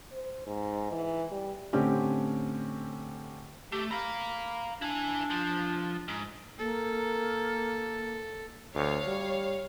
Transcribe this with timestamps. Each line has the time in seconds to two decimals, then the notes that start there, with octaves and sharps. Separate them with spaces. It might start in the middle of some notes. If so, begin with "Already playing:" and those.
0.11 C5
0.46 G#2
0.92 E3
1.31 G3
1.73 A2 D3 C4 C#4 G4
3.72 A3 G4
3.91 F5 A#5 B5
4.82 D4 E4 G#5
5.30 F3
6.08 G#2
6.58 A#3 A4
8.75 D2 C#5 F5
9.07 G3